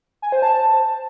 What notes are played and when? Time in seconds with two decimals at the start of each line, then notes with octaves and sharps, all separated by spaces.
0.22 G#5
0.32 C5
0.42 A5